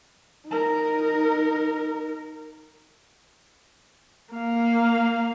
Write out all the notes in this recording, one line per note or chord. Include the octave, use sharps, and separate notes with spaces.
D#4 A#4
A#3 F5